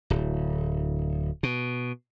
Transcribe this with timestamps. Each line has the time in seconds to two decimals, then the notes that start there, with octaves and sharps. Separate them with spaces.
0.10 D1
1.43 B2